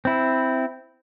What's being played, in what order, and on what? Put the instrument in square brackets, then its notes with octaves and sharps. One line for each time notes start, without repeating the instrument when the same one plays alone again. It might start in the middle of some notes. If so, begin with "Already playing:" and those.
[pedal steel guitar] C4 E4